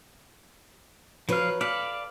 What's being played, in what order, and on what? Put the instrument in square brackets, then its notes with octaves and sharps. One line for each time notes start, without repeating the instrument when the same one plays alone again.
[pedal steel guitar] F3 F5 [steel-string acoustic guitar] F#3 B4
[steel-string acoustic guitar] A4 [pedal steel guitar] D5 F5 B5